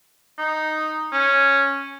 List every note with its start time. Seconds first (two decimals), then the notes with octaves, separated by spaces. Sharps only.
0.39 D#4
1.13 C#4